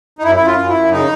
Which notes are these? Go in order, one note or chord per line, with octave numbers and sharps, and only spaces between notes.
D#4
F#2 E4
E4
F#2
F4
F#2
E4
F#2
C#3 D#4